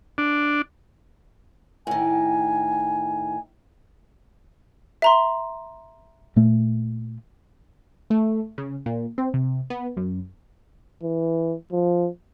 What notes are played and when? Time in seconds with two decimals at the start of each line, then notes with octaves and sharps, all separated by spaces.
0.18 D4
1.87 A2 D#3 G#5
5.02 E5 A#5 C6
6.36 A#2 A3
8.10 A3
8.58 C#3
8.86 A#2
9.18 C4
9.34 C3
9.70 B3
9.97 F#2
11.03 E3
11.72 F3